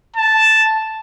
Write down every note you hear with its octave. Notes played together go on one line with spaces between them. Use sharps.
A5